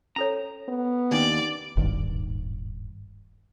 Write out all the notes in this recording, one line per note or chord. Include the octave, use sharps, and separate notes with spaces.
C#4 A4 C#5 A#5
B3
D#2 C#4 D4 D5 G5
D#1 G#1 G2 D#3